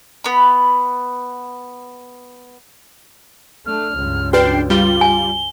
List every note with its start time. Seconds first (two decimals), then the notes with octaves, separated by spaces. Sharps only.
0.24 B3 B5
3.66 A3 D4 F6
3.96 C#2 G2
4.33 D4 F#4 B4 G5 C7
4.70 G3 F4 G7
5.01 G#5